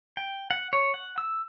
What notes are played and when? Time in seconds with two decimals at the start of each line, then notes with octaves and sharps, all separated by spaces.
0.17 G5
0.51 F#5
0.73 C#5
0.94 F#5
1.18 E6